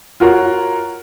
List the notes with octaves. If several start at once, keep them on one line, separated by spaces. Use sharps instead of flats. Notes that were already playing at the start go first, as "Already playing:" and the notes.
F4 F#4 A#4 C#5